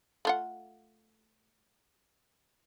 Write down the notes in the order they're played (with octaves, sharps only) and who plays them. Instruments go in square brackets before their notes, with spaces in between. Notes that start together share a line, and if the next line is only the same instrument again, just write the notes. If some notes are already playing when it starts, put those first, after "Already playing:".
[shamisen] A3 F4 F#5